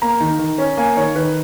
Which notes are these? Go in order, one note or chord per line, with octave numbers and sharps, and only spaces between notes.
A#3 A#5
D#3
D#3
C#4
A#3 G#5
D#3 C#5
D#3 B4